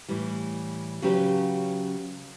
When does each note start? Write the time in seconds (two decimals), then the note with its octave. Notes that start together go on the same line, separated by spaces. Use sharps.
0.09 A2 E3 G3
1.02 C#3 F#3 C#4 G4 B4